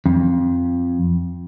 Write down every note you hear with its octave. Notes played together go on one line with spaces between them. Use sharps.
F2